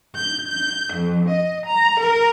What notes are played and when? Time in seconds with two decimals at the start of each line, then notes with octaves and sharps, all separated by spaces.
0.15 G6
0.48 G6
0.93 F2
1.29 D#5
1.66 A#5
2.00 A#4